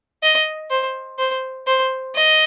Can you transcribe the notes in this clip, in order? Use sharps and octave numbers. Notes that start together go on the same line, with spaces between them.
D#5
C5
C5
C5
D#5